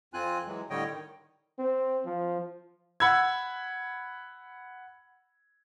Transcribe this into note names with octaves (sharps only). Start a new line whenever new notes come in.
F2 C4 F4 G#5 F#6
E3 F#3 G#3
A2 D3 G3 C#5 D#5 G5
D#3
C4
F3
F#5 B5 E6 G#6